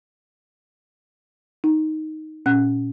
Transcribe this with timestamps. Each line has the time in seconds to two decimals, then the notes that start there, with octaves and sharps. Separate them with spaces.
1.64 D#4
2.46 A#2 C#4 F#5 F#6